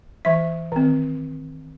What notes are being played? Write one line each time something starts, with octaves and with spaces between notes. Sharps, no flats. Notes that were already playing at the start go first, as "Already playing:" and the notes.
E3 E5
D#3 C4